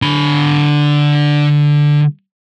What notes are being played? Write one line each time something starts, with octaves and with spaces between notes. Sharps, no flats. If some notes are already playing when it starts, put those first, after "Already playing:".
D3 B5